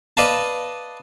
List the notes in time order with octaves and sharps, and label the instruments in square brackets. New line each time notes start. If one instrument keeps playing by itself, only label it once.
[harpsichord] B4 D5 D#5 F5 A5